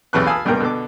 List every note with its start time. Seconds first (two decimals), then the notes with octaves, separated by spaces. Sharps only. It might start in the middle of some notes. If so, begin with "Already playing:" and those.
0.13 B1 E2 C3 B4 C#6 F#6
0.26 F5 G#5 A5 B5 D#6 E6
0.45 C#2 G2 B2 A#3 G5 A#5
0.60 B2 D3 D6